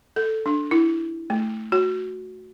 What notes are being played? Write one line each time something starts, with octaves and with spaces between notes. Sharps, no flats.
A4
D4
E4
A3
F#4